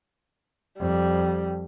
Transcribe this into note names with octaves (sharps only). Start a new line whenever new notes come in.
F2 G3